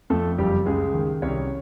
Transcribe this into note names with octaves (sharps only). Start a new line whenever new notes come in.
F2 A3 A4
F#1 G3 G4
C#2 G#3 G#4
D#3
C2 C#4 C#5